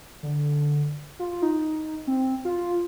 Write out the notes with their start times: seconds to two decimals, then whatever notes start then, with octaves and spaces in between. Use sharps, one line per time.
0.23 D3
1.19 F4
1.42 D#4
2.07 C4
2.45 F4